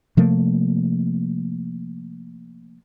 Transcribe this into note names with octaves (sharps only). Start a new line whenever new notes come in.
C3 F3 A3 A#3